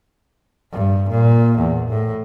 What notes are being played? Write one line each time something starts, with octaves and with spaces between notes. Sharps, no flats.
G2
A#2
E2
A2